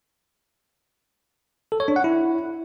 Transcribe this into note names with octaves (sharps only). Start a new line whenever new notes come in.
A4
C#5
D4
F#5
E4